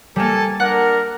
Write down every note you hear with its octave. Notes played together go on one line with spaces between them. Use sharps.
G3 A#3 A4 G#5 A5
D4 A#4 F#5 F#6